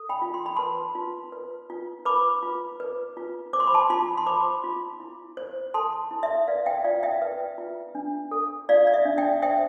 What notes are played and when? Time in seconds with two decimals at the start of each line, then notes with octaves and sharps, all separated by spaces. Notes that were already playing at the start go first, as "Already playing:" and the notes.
Already playing: A4
0.09 G5 B5
0.22 F4
0.34 C6
0.46 B5
0.56 B4 A5 C6
0.95 F4
1.32 B4
1.70 F4
2.05 B4 B5 D6
2.43 F4
2.80 B4
3.17 F4
3.53 C5 D6
3.60 C6
3.67 B5
3.74 A5 C6
3.90 F4 A5 C6
4.18 C6
4.26 C5 B5 D6
4.64 F4
5.00 E4
5.37 C5
5.74 A4 A5 C6
6.11 E4
6.23 E5
6.48 B4 D5 F5
6.66 E5 G5
6.84 F4 D5 F5
7.03 E5 G5
7.22 B4
7.58 F4
7.95 D4
8.31 A4
8.69 F4 D5 F5
8.87 D5
8.94 E5
9.05 D4
9.18 E5 G5
9.42 C5 E5 G5